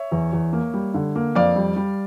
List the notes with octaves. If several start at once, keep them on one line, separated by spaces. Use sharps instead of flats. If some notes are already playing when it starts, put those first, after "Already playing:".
Already playing: C#5 E5
E2
E2
A#3
G3
D3
A#3
F2 D5 F5
G3
G3